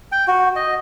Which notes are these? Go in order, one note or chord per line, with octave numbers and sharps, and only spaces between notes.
G5
F#4
D#5